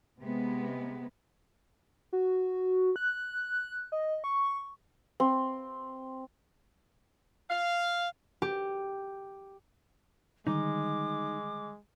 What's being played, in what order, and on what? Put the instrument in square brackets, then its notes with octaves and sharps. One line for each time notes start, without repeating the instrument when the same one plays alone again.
[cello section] C3 G#3 B3
[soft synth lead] F#4
F#6
D#5
C#6
[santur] C4
[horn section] F5
[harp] G4
[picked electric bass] D3 D#3 G3 [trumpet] G#3 [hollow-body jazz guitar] D#4 [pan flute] D6